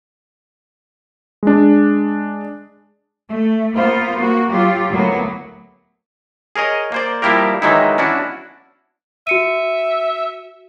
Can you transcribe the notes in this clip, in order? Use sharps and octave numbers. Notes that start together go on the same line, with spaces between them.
G#3 D4
A3
A#3 B3 F4 C5
A#3 F#4
F#3 F4 G4
D2 A2 F#3 A#3 B3
G#4 A#4 C#5 D#5
A#3 C5 D5
F3 G3 A#3 E4 G4 A#4
D#3 E3 F#3 G#3 D#4 E4
C#4 D4 E4 F#4
F#4 E5 C#7 D#7